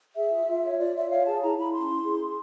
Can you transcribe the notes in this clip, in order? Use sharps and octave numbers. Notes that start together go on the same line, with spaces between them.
G#4 E5
F4
F4
C#5
F4 D5
F4 E5
C#5 F5
G#4 A5
E4 A#5
E4 B5
C#4 C6
E4
G#4
G#4